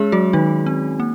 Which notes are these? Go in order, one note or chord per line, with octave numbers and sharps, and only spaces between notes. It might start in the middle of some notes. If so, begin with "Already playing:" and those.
Already playing: G#3 C#4 G#4 C#5
F#3 F#4
D#3 D#4
C4
A#3